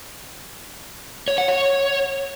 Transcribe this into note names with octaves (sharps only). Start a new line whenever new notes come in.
C#5
F#5
C#5